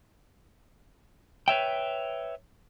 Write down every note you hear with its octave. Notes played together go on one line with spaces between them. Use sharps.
B4 C#5 E5 G5